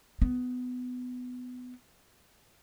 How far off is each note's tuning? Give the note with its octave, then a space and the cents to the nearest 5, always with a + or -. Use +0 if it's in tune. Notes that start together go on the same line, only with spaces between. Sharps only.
B3 +20